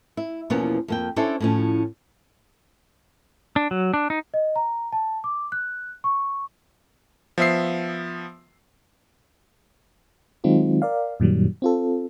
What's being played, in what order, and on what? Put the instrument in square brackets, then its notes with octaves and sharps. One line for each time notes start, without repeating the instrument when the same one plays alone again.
[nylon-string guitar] E4
E2 B2 F3 A#3 B3 C#4
F2 A#3 G5
C#4 D4 E4 A4 C5 C#5
A2 F3 C#4
[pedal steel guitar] D4
F#3
D4
D#4
[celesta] D#5
A#5
A5
D6
F#6
C#6
[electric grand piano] F3 B3 E5 E6 C7
[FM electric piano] D#3 F#3 G#3 C4 D#4 F4
A#4 D5 F5
F#2 A#2 D#3 F#3 G3
C4 F4 A4